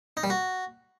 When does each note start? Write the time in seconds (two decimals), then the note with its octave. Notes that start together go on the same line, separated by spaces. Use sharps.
0.17 D#4
0.24 G3
0.30 F#4